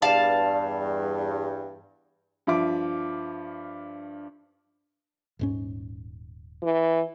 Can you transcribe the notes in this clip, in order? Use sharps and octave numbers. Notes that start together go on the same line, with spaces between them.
E2 G2 D5 F5 A5
G2 F3 E5 D6
D#1 G#2 C#4
E3